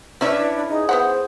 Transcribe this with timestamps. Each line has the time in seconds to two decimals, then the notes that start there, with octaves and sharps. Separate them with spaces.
0.21 C#4 D4 E4 B4 D5 E5
0.69 D#4 G#4
0.89 B3 C5 E5 F#5